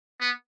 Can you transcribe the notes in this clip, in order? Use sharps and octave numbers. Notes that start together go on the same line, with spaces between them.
B3